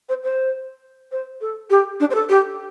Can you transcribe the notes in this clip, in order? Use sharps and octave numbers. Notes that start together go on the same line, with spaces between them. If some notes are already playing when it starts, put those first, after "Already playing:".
C5
C5
C5
A4
G4
D4
C5
A4
G4